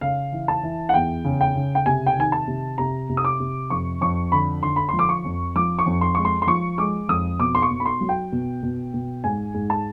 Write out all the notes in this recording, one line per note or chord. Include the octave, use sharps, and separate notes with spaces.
C#3 F5
E3
A5
E3
F#5
E2 G5
C#3
G5
C#3
G5
C3 G#5
G5
D#3 G#5
A5
C3
C3 A#5
C3
D#6
D6
C3
F2 C#6
F2 C#6
D3 B5
D3 C6
B5
F3 C6
D6
C#6
F2
F3 D6
C#6
F2
C6
G#3 C#6
C6
C6
F3 C#6
G#3 D6
F2 D#6
B2 D6
C6
C#6
B2
B5
C6
F#3
G5
B2
B2
B2
G#2 G#5
G#2
A5